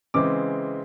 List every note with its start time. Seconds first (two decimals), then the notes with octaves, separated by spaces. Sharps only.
0.14 C#3 E3 G#3 C4 D6